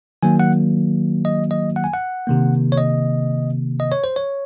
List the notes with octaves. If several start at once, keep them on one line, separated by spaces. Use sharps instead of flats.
D#3 F#3 A#3 G#5
F#5
D#5
D#5
F#5
G#5
F#5
C3 D#3 A#3
C#5
D#5
D#5
C#5
C5
C#5